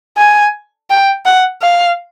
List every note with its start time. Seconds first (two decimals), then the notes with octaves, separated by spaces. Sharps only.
0.17 G#5
0.90 G5
1.25 F#5
1.62 F5